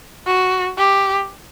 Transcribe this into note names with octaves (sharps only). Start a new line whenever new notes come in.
F#4
G4